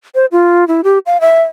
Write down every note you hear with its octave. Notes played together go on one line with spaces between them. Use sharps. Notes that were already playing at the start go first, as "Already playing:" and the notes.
C5
F4
E4
G4
F5
E5